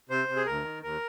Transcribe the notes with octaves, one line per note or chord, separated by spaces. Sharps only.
C3 C5
C3
G#4
D2 A#4
D#3
D#2 A#4